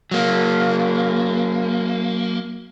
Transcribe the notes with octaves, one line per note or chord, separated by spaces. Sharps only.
F#3 A#3